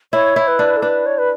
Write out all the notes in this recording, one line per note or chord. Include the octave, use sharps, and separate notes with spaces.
E4 C#5
E4
B4
D4
A4
D4 B4
C#5
B4